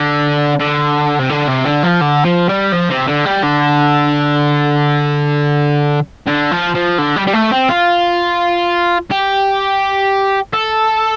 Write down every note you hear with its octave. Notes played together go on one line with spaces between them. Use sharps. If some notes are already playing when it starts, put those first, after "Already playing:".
Already playing: D3
D3
C3
D3
C3
D3
F3
D3
F3
G3
F3
C3
D3
G3
D3
D3
F3
F3
D3
G3
G3
A3
C4
F4
G4
A4